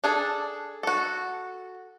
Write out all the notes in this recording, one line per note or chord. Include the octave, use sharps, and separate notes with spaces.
D4 G#4 A4
F#4 A4